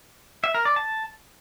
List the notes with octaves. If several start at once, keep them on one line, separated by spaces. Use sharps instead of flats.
E5
A#4
D5
A5